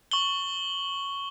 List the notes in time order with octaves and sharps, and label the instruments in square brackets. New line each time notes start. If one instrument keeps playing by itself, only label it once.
[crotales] C#6 F#7 G7